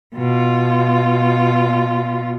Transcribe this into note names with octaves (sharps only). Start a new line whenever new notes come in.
B2 F4